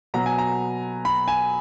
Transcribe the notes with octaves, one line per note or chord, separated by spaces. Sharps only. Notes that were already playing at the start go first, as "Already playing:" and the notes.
B2 F#3 B3 A#5
G#5
A#5
B5
G#5